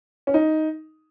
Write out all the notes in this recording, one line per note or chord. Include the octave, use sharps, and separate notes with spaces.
C#4
D#4